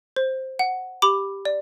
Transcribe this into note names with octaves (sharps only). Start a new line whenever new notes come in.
C5
F#5
G4 B5 D6
D5